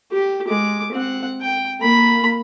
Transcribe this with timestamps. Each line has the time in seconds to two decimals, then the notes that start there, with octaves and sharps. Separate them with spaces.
0.12 G4
0.48 G#3 D6
0.92 C4 F#5
1.41 G5
1.81 A#3 B5